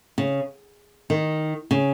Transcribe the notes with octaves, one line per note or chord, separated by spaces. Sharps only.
C#3
D#3
C#3